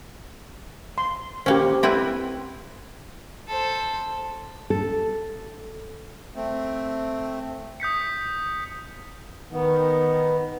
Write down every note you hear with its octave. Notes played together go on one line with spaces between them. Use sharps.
C6
A#3 C#4 G4 C5
C4 E4 B4
A4 C5
A4
A3 C4
D#6 G6 B6 C#7
D#3 B3